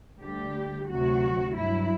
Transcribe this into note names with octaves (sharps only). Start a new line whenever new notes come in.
D2 D3 G3 G4
D2 C3 F#3 F#4
G2 F#3 E4